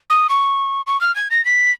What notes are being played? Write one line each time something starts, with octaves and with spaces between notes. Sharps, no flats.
D#6
C#6
C#6
F6
G#6
A#6
B6